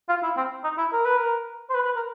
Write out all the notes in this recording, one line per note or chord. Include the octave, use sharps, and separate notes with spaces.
F4
E4
C4
D#4
E4
A#4
B4
A#4
C5
B4
B4
A#4